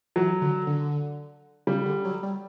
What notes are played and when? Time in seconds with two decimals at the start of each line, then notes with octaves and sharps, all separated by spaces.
0.16 E3 F#3
0.41 D3
0.67 D3
1.67 C#3 G3
1.86 D3
2.05 F#3
2.23 G3